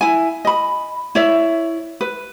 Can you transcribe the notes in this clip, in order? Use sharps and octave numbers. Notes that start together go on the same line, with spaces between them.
E4 G#5
D#5 B5
E4 C#5 D5 E5
B4